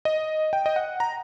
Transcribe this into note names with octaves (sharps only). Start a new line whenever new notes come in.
D#5
G5
D#5
F#5
A#5